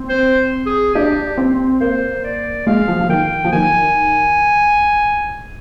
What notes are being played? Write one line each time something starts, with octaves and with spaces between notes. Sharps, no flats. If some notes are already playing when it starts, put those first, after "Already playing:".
Already playing: C4
C5
G#4
D4 G4
C4
A#3 C5
D5
G#3 F5
F3
F3
D#3 G5
F3
D#3 G#5